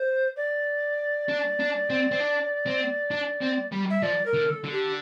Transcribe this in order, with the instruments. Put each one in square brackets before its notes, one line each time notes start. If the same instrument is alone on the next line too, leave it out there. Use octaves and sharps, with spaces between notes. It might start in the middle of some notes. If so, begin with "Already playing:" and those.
Already playing: [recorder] C5
D5
[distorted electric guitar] D4
D4
C4
C4
D4
C4
D4
C4
G3
[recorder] E5
[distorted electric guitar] F3 [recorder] D5
[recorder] A#4
[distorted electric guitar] D3
[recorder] A4
[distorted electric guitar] D3
[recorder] G4